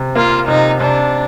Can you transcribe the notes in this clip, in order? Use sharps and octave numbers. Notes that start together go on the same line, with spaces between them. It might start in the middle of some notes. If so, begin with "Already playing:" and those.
Already playing: C3
A#3 F4
C3 D#4
C3 D4